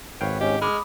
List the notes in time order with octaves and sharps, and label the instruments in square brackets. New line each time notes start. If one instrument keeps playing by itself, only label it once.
[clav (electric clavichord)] G#1 F5 G5 [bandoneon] B4 C#5
[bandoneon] G#2 C#4 [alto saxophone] G4 [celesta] D#5
[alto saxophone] G#3 [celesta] B5 D6 D#6 [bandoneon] F6